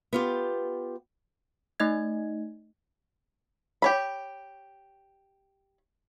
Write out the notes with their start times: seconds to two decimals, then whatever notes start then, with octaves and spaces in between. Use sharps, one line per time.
0.13 B3 F4 G4
1.80 A3 D#4 D#5 G#6
3.82 G4 C#5 B5